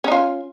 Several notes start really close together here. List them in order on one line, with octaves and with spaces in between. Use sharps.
C#4 D#4 F4